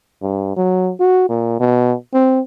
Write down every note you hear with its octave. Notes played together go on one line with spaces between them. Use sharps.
G2
F#3
F#4
A#2
B2
C4